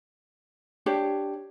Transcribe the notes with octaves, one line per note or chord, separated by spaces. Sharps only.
D4 G4 C#5